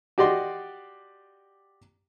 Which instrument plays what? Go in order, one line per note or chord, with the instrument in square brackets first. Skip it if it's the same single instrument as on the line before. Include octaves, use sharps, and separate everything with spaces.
[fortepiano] F#4 G4 D5 D#5 C6